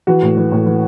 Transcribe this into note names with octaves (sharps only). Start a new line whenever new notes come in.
E3 F#4
A2
E3
A2
E3